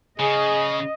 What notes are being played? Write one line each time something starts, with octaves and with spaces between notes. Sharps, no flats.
C#3 G#4 D#5